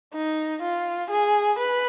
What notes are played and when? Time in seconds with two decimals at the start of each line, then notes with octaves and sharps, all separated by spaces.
0.14 D#4
0.62 F4
1.10 G#4
1.59 B4